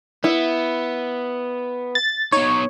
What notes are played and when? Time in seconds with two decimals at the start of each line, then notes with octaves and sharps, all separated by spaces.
0.24 B3 E4
1.95 A6
2.32 B3 D#4 C#5